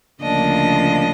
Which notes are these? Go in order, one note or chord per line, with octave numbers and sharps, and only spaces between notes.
D2 C#3 F3 A#3 D4 D#5